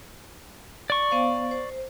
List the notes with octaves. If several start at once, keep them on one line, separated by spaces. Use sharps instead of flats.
D5 C#6
B3 C5 F5
C5